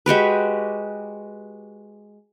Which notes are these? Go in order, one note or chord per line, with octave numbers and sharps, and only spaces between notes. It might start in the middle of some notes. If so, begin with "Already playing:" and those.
G#3 F#4 G4 B4